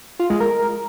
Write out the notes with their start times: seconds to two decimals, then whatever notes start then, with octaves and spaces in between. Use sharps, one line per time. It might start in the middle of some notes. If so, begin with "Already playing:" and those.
0.19 F4
0.30 G#3
0.40 A#4